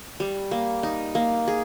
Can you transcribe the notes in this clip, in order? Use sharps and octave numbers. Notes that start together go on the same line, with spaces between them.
G3
A#3
D#4
A#3
G#4